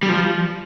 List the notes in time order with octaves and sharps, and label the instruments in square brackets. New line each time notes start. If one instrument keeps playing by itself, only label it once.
[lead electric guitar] G3
F3